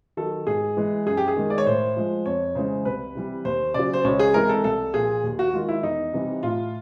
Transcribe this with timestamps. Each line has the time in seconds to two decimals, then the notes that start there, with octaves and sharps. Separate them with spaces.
0.17 D#3 F#3 A4
0.47 G#2 G#4
0.77 E3 G#3
1.06 F#2 G#4
1.17 G4
1.28 G#4
1.36 D#3 G#3
1.50 D5
1.58 C#5
1.66 A2 C5
1.96 F3 G#3
2.26 F2 C#5
2.55 C#3 E3 G#3 C5
2.85 C2 B4
3.15 C3 E3 G3
3.45 D#2 C5
3.74 C#3 F#3 D5
3.93 C5
4.04 C#2 C#5
4.19 G#4
4.34 C3 E3 G#3 A#4
4.49 A4
4.64 C2 A4
4.94 A#2 F3 G#4
5.24 D#2
5.39 F#4
5.54 D#3 G#3 F4
5.69 E4
5.83 E2 D#4
6.13 C3 E3 G3
6.43 A2 F4